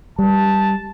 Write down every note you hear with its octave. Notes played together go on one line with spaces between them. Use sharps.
G3 A5